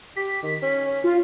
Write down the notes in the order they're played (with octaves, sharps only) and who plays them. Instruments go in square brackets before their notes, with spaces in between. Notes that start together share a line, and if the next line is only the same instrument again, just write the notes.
[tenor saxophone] G4 [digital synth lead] B6
[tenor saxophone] D#3
C#4
[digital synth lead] F4